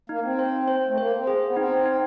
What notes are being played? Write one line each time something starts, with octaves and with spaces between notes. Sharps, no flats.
A#3 D#4
C4
C5
C5
A3
A#3 C5
C4
G#4
B3
C4 D#4
D#4